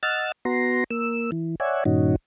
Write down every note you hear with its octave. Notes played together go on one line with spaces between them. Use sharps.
D#5 F#5 E6 F6 A6
B3 F#4 A#5 C6
A#3 E6
E3
C#5 D5 E5 F#5 G#5
G2 A#2 D#3 C#4 D#4 F#4